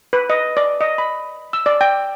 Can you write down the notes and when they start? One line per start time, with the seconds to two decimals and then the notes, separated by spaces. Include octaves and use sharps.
0.13 B4
0.30 D#5
0.57 D5
0.81 D#5
0.98 B5
1.53 E6
1.66 D5
1.81 G5